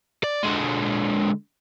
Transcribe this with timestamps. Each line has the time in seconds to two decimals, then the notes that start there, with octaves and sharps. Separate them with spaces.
0.23 D5
0.43 D3 G#3